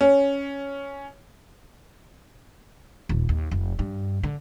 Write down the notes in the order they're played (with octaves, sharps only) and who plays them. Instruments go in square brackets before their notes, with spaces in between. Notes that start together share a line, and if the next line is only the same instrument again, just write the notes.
[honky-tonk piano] C#4
[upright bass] D#1
D#2
F1
G2
D3